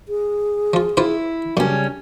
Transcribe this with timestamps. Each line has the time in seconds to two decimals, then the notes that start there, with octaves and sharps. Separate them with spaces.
0.08 G#4
0.73 F3 F4
0.97 E4 F4 B4 C5
1.57 F#2 C#3 G3 C#4